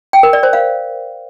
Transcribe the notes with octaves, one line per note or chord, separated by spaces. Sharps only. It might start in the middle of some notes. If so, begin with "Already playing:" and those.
G5
A#4
D5
C5
F5